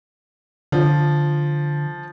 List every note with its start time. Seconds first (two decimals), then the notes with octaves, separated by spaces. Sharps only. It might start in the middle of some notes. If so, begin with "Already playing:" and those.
0.72 D3 F3